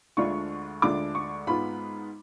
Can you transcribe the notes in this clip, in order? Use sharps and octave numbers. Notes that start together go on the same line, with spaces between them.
D2 D3 G#3 D4 F4 C#6
D2 D3 G#3 D4 F4 D6
C#6
G#2 G#3 B3 F4 B5